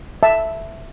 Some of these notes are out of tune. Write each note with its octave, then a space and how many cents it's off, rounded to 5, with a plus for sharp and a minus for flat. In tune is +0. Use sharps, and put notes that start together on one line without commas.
E5 +0 A5 +0